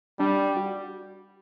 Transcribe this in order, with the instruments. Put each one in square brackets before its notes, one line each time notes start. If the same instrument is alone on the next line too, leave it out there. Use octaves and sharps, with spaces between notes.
[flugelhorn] G3 [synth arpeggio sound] D4
[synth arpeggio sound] F#4